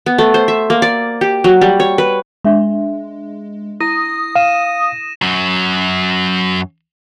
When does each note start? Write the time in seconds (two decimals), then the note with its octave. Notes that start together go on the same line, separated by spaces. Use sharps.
0.06 B3
0.18 A3
0.34 C5
0.48 E5
0.70 A#3
0.82 D5
1.21 G4
1.44 F#3
1.61 G3
1.80 C#5
1.98 B4
2.45 G#3 D4 E5 C6
3.80 E4 D#6 A#6
4.35 F5 D#7 E7
5.22 F#2 F#3